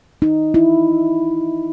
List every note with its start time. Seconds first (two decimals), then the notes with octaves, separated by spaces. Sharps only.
0.22 D#4
0.54 E4